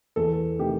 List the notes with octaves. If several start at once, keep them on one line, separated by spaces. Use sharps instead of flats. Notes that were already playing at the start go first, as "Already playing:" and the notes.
E2 A4
C3 D#3 A3 G4